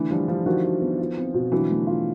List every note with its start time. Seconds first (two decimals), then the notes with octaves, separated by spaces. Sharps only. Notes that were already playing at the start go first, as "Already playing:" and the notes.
Already playing: D3 E3 A3
0.11 F3 G3 D4
0.28 F3 G3 D4
0.46 D#3 F3 F#4
0.64 F#4
0.81 B3
0.99 F4
1.17 C4
1.34 B2
1.52 D3 E3 F#3
1.70 A3
1.87 F4